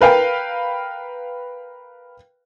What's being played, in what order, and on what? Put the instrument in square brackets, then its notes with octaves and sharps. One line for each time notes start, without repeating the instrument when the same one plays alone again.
[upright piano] A#4 B4 F5 G5